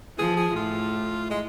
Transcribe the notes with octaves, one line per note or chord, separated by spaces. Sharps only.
F3 G#4
G#4
A2 F4
G#3